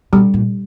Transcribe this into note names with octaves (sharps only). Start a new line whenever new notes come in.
B2 G3
A#2